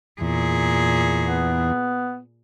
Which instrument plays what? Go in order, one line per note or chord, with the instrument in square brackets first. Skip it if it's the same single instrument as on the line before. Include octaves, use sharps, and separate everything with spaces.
[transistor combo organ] E2 [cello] A#2 G#4
[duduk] B3